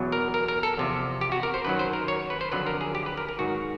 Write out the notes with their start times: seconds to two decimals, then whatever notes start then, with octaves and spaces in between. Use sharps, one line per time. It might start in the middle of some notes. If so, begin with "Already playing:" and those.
Already playing: E2 B2 F#3
0.12 A#4
0.34 A#4
0.48 A#4
0.63 A4
0.77 E2 C3 F3
1.21 G4
1.32 F#4
1.43 A#4
1.54 C5
1.65 F#2 D#3 F#3 B4
1.79 C5
1.93 A#4
2.08 C#5
2.30 B4
2.41 C5
2.52 F2 D3 F#3 B4
2.66 A#4
2.81 G#4
2.95 G4
3.06 B4
3.17 A#4
3.29 A#4
3.39 G#2 D#3 F#3 F#4